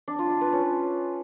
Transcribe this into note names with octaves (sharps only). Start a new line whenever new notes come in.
D4
F4
F4
B4
C#4